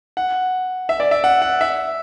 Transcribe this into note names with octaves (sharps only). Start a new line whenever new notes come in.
F#5
E5
D5
E5
F#5
F#5
E5